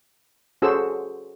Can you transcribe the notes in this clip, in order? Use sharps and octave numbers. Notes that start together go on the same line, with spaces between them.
C#4 F#4 G#4 A4 C5 E6